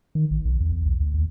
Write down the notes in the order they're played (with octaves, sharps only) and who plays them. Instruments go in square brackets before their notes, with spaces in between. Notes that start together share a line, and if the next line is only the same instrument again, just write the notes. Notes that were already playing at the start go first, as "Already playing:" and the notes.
[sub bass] D#3
A1
B1
E2
E2
B1
D2
D#2